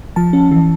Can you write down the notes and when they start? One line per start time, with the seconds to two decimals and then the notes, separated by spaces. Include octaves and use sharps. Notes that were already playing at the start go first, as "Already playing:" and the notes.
0.16 F3 A5
0.33 C#4
0.51 E3